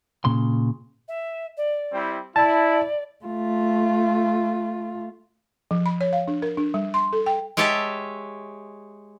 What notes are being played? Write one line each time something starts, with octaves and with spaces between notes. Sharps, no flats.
A#2 C#3 C6
E5
D5
G3 C4 E4
E4 D5 A5
A3 F4
F3
B5
C#5
F5
D4
A#4
D4
G3
C6
A4
G5
G#3 G4 C#5 E5 A5